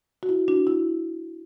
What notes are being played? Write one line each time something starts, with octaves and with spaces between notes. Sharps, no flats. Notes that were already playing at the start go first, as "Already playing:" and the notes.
F#4
E4
D4 F#4
E4